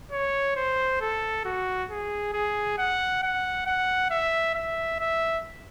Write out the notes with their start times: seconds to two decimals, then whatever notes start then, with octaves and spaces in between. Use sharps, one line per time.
0.12 C#5
0.56 C5
1.01 A4
1.45 F#4
1.90 G#4
2.33 G#4
2.78 F#5
3.23 F#5
3.66 F#5
4.10 E5
4.55 E5
5.00 E5